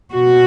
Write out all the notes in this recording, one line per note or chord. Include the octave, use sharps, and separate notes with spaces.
B2 F#4